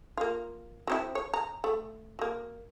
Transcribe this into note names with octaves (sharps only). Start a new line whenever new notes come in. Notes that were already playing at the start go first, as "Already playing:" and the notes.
A#3 F4
F#3 C4 E4
C#5
A#5
A3
F#3 A#3